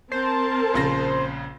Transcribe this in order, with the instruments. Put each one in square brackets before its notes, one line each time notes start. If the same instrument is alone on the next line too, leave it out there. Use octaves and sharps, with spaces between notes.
[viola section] C4 A#4 A5 [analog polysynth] C5
[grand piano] A#1 C#3 A#6